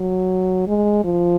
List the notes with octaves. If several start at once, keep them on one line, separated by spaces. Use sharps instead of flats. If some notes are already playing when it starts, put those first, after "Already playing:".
Already playing: F#3
G#3
F3